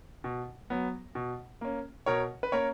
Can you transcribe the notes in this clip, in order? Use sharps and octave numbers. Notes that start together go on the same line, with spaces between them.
B2
F#3 B3
B2
A#3 C#4
B2 A#4 C#5
B4
A#3 C#4 A#4 C#5